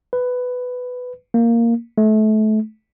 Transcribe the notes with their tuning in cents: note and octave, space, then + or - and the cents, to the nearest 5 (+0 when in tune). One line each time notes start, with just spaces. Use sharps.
B4 +10
A#3 -5
A3 -30